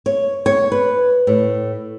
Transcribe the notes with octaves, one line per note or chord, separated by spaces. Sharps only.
C#5
C#5
B4
A2